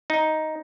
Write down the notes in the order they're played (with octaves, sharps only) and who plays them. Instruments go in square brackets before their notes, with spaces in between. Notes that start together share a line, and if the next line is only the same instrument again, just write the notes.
[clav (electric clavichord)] D#4